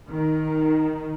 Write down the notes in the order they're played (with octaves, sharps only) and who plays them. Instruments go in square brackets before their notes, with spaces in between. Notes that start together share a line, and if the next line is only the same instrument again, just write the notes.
[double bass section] D#3